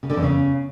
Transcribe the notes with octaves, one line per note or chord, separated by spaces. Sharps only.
C#3
D3
E2
C#3